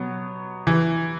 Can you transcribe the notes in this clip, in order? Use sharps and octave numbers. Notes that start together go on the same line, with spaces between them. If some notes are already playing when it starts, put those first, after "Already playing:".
Already playing: B2 F#3 B3
E3